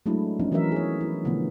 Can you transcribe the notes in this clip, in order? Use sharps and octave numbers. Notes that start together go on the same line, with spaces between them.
F#3 G#3 A3 D4 E4
F3 B3 C#4 D#4
E3 F#3 C#4 A#4 E5
G#4 C#5
E4
B2 D3 F3 A3 B3